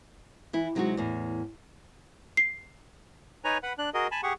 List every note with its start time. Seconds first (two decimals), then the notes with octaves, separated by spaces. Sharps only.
0.53 E3 E4
0.75 C3 F#3 G#3 C4 D#4 F#4
0.97 E2 A2
2.37 C7
3.44 D#4 B4 C#5 G#5 A#5
3.63 B4 F#5 B5
3.78 D4 F#6
3.94 F#4 G#4 A#4 D#5
4.11 G#5 A5 B5
4.23 G4 G#4 F#5 C#6